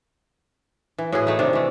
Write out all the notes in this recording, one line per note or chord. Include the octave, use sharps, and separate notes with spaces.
E3
A2 E3 F#4 G#4
A3 D#4
C3 D#3 D4
E3 A3